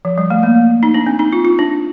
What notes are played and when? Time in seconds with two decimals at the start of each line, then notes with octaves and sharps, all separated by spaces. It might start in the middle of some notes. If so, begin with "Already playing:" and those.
0.05 F3
0.18 G3
0.30 A3
0.43 A#3
0.83 D#4
0.94 D4
1.06 C4
1.19 D#4
1.33 F4
1.45 F4
1.59 D4